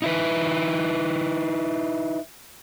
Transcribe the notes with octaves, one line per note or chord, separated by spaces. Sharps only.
D#4 E4 B4